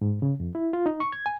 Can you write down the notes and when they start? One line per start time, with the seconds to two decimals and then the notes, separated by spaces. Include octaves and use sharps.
0.01 G#2
0.22 C#3
0.40 F2
0.55 E4
0.73 F4
0.86 D#4
1.00 C#6
1.12 G#6
1.26 G#5